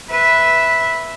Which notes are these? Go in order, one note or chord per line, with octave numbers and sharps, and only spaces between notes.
B4 E5